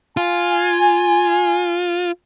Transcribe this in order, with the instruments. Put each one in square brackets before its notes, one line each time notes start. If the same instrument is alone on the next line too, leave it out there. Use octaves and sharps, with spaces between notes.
[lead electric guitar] F4 [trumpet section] G#5